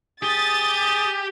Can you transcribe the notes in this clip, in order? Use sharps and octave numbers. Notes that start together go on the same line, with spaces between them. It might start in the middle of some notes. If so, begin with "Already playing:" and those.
G4 G#4 D#6 A6